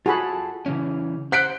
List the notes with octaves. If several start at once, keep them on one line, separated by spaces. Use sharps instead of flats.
F4 F#4 G#4 A4 A5 B5
C#3 E3 C#4
C5 F#5 F#6 B6 D7